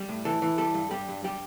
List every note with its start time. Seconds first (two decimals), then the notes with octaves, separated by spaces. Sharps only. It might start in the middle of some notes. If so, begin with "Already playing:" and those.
Already playing: G3
0.09 A2
0.25 E3 A4
0.42 E3
0.58 G3 A4
0.74 G2
0.91 G3 G4
1.08 G2
1.24 G3 G4